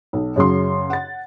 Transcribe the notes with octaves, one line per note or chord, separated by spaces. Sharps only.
B1
F#2 C#3 F#3 C6
F#5 A6